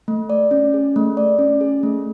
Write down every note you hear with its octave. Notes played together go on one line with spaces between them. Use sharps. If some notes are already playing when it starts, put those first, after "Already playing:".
A3
D5
C#4
G#4
A3
D5
C#4
G#4
A3